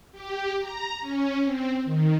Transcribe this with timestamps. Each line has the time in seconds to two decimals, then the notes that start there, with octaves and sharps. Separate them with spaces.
0.12 G4
0.59 A#5
1.00 C#4
1.44 C4
1.85 D#3